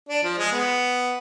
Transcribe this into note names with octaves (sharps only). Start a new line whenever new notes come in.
D4
F3
G#3
B3